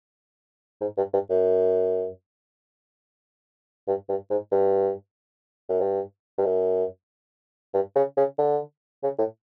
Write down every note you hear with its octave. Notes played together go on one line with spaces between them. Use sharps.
G#2
G2
G2
F#2
G2
G2
G#2
G2
F#2
G2
G2
F#2
G2
C#3
C#3
D3
C#3
A2